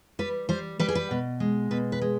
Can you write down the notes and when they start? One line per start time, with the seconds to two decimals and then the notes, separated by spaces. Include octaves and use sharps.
0.19 G3 B4
0.49 G3 C5
0.79 G3 B4
0.88 G#4
0.95 B4
1.11 B2
1.40 G#3
1.71 B2 B4
1.92 B4
2.01 G#3